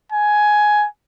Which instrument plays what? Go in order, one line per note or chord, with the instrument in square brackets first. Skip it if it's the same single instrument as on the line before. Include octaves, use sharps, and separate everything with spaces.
[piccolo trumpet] G#5